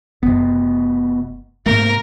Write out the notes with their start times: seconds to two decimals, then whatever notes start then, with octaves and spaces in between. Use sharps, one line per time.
0.23 F#1 C3 A3 B3
1.66 G#2 C3 A3 A#3 A#4